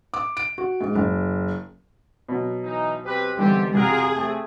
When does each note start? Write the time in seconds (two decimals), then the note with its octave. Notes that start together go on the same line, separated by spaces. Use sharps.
0.14 D6
0.37 D7
0.58 F#4
0.81 G#2
0.96 F#1
2.28 B2 F#3
2.63 E3 D#4
3.05 C4 G4 B4
3.37 G#2 D3 E3 G3 B3 C4 G4
3.75 C3 F4 F#4 G#4 A#4 F#6
4.14 A3 C4